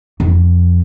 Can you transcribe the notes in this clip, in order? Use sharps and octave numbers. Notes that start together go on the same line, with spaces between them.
F2